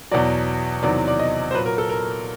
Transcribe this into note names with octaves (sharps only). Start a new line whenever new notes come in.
E2 B2 F#3 D5
E2 C3 D#3 F#3 D5
D5
D#5
C5
A#2 F#3 B4
A#4
A4
A#4